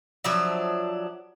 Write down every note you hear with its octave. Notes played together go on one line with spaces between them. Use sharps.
F3 F#3 D4 E5